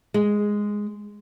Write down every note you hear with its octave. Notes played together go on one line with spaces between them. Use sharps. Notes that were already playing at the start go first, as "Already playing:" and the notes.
G#3